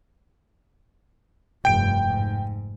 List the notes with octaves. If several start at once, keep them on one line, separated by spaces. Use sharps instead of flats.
F1 G2 G5 D7
G#2